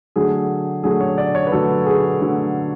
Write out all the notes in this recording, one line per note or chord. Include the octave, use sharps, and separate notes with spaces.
D3 F#3 A3 G#4
D3 F#3 A3 G#4
C#5
D5
C#5
B4
D3 F#3 A3 A4
G#4
D3 F#3 A3